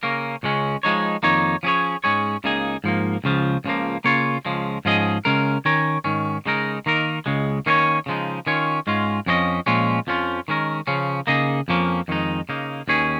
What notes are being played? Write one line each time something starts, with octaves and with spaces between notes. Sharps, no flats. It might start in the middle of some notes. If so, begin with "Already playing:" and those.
C#3 A#3 C#4 A#4
C#2 C#3 G#3 C#4
F3 G#3 D#4 C#5
F2 D#3 A#3 D#4 C#5
F3 C#4 G#4 C#5
G#2 G#3 C#4 G#4 C#5
C#2 C#3 A#3 D#4 G#4
G#2 F3 A#3
C#2 C#3 F3
C#2 C#3 F3 A#3
C#3 A#3 C#4 F4 C#5
C#2 C#3 F3 G#3
G#2 F3 C#4 G#4 D#5
C#3 G#3 C#4 A#4
D#3 C#4 A#4 C#5
G#2 D#3 C#4
C#3 G#3 D#4 A#4
D#3 A#3 D#4 A#4
C#2 C#3 G#3
D#3 A#3 C#4 G#4 C#5
C#3 F3 G#3 D#4
D#3 C#4 F4 C#5
G#2 G#3 C#4 F4
F2 F3 C#4 G#4 D#5
A#2 F3 G#3 C#4 F4
F2 F3 C#4 F4
D#3 G#3 C#4 A#4
C#3 F3 C#4
C#3 A#3 D#4 G#4 D#5
F2 F3 A#3 C#4
F2 D#3 G#3 D#4
C#3 A#3 D#4
D#2 D#3 C#4 G#4